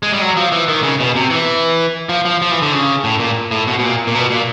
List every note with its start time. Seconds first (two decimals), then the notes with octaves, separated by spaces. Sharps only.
0.03 G#3
0.12 G3
0.21 F#3
0.37 F3
0.52 E3
0.68 D#3
0.83 C#3
1.00 B2
1.16 C3
1.30 E3
2.09 F3
2.25 F3
2.42 F3
2.51 E3
2.62 D3
2.73 C#3
3.04 A2
3.19 A#2
3.51 A2
3.67 B2
3.79 B2
3.83 A#2
4.07 A#2
4.15 B2
4.30 A#2